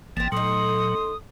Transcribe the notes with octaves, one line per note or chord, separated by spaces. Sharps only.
G#1 E3 F3 A#3 C4 A6
A#2 F#3 A3 D#4 C6 D#6